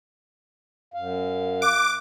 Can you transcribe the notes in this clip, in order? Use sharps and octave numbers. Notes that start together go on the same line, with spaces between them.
F#2 F5
D6 F#6